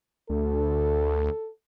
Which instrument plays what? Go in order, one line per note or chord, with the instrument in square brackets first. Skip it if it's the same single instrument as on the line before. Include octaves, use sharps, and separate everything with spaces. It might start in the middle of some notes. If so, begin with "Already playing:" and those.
[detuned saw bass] D2 [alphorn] A4